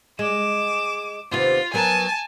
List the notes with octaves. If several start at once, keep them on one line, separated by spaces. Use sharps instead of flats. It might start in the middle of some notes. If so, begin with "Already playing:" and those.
G#3 D6 E7
D#2 C3 B3 F4
F#3 B3 A#4 G#5 A5